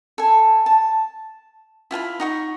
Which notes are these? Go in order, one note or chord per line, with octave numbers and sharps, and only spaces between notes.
A4 G#5
A5
E4 F4 G#5 B5
D#4 F#5 C#6